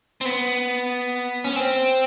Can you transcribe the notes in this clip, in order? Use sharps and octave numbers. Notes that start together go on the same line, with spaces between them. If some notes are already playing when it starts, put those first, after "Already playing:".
C4
B3
C#4
C4